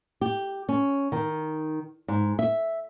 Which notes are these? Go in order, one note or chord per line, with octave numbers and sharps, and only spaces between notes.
G4
C#4
D#3
G#2
E5